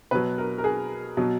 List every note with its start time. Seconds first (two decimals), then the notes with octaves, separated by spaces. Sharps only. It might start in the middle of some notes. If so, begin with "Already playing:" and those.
0.11 B2 F#3 B4
0.38 A#4
0.58 A#4
0.64 G#4
1.17 B2 F#3